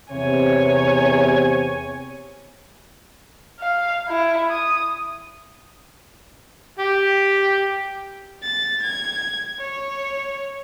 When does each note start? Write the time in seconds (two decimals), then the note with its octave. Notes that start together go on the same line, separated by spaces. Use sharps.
0.12 E2 C3 C#5 G#5
3.60 F5
4.08 E4
4.50 D#6
6.79 G4
8.42 A6
8.82 G#6
9.59 C#5